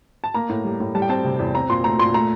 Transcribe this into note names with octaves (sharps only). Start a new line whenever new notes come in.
A5
A#3 A#5
A2
G3
A2
G3 A5
G5
C4 A5
C3
E2
C4 A#5
A#2 C6
A3 A#5
A#2 C6
A3 A#5